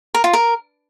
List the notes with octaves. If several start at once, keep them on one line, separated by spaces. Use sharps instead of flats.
A#4
F4
A#4